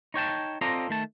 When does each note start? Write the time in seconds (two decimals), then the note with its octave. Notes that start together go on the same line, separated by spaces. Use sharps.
0.14 D#4 C#5 G5 A5
0.61 C4 F4 A4 D5 D#5 A#5
0.89 D#3 A3 A5